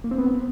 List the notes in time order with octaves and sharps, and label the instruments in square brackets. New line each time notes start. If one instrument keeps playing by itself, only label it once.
[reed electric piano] A#3
C4
B3